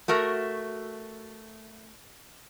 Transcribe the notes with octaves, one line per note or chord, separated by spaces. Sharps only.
A3 F#4 A#4 E5